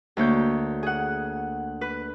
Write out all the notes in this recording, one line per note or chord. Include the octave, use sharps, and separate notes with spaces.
D2 A#3 C#5 G6
G#4 F#5
B4